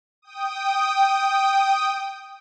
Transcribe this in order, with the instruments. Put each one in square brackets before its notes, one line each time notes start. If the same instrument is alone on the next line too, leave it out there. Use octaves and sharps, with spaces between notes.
[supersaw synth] G5 D#6